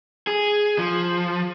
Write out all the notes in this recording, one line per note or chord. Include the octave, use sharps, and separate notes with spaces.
G#4
F3